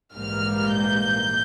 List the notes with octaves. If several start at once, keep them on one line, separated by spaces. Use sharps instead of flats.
A#1 G#2 E3 G3 A#3 F6
G6